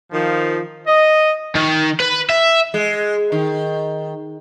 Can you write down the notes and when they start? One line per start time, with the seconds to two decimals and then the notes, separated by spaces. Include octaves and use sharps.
0.12 D#3 F3
0.88 D#5
1.55 D#3
2.00 B4
2.29 E5
2.74 G#3
3.32 D#3